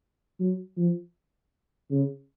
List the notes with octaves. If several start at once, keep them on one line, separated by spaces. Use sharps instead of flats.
F#3
F3
C#3